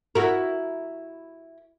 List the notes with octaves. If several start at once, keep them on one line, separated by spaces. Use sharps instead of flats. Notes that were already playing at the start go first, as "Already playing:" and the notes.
E4 F#4 A#4